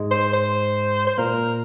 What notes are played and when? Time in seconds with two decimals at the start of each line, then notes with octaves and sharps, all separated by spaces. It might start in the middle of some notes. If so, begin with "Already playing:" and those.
Already playing: G#2 G#3
0.11 C5
0.33 C5
1.07 C5
1.18 A#2 A#3 A#4